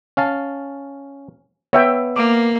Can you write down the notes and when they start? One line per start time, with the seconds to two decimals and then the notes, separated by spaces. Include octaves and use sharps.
0.17 C#4 F5 A5
1.73 B3 C#5 E5 G5
2.16 A#3 D6